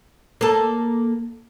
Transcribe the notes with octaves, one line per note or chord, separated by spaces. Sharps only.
A#3 A4